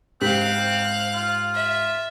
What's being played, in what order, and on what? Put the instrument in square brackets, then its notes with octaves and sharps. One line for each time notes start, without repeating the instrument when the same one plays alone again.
[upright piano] G#2 G4 B6 [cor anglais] C4 [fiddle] F5 F#6
[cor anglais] F4
[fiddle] E5